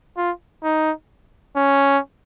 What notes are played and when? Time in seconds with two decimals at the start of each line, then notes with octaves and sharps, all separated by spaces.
0.17 F4
0.64 D#4
1.57 C#4